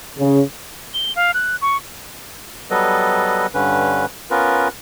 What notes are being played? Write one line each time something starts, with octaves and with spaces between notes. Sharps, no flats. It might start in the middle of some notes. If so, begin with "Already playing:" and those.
C#3
G7
F5
F#6
C#6
F#3 G3 B3 A4 B4 D#5
G2 D3 C#4 B4
B3 C#4 F4 A#4 B4